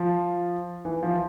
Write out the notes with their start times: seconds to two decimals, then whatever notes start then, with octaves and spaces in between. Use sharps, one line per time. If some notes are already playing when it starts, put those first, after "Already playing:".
Already playing: F3
0.85 E3
1.03 F3